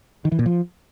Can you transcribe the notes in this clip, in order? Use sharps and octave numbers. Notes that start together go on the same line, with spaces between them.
D#3
E3
A#2
F3